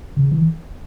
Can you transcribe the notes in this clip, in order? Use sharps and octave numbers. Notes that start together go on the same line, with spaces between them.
C#3
E3